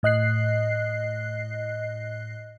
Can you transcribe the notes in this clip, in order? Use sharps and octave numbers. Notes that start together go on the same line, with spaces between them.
A2 D#5 F#6 C7